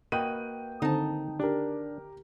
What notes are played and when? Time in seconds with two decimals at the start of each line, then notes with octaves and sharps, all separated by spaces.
0.12 A#3 F#4 B4 D#5 G5 D#7
0.82 D3 D#3 C4 D#4 A5
1.40 D4 G4 A#4